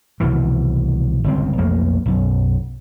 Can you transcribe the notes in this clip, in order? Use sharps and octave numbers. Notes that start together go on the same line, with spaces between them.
C2 B2 D#3 E3
G1 C#2 C4
B1 F2 A3 A#3
B1 F#2